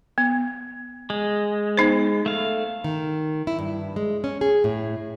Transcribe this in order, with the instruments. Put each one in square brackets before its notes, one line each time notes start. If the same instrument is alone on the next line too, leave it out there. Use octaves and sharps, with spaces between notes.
[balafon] B3
[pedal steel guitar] G#3
[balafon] B3 D#4 C5
[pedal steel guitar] A3 F5
[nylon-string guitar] D#3
E4
G2
G#3
C#4
G#4
A2